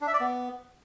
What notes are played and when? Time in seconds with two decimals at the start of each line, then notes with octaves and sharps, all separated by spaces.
0.01 D4
0.07 E5
0.14 D5
0.20 B3